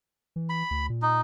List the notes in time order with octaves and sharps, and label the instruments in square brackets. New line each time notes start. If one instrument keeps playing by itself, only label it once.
[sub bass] E3
[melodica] B5
[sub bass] D2
A#2
[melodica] D#4